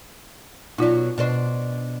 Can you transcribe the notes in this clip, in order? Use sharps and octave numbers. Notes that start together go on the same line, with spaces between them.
B2 F#3 D#4 F4 D5
B2 D4 C5